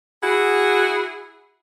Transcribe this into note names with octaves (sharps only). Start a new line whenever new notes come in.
E4 F#4 G#4